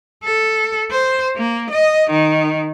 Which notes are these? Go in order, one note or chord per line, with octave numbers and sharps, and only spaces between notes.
A4
C5
A#3
D#5
D#3